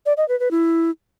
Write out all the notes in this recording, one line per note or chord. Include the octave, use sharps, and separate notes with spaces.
D5
D#5
B4
B4
E4